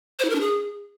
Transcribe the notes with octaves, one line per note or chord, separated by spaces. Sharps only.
C5
E4
A#4
D4
G#4